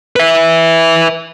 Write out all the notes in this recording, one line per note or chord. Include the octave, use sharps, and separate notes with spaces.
B4 E5